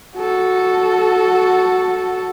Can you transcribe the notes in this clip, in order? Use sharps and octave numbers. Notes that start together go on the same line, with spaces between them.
F#4 A4